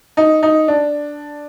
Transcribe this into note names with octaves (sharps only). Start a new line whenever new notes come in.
D#4
D#4
D4